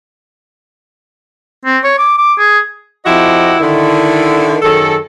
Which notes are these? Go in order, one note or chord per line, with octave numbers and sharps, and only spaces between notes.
C4
C#5
D6
D6
G#4
F2 F3 E4 F#4 G4 D#5
D3 D#3 E4
F#2 D#3 G#4 A4